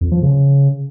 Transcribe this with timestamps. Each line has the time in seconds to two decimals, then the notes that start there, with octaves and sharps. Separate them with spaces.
0.01 F2
0.12 F3
0.22 C#3